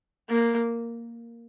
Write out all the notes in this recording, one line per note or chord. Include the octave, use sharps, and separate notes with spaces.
A#3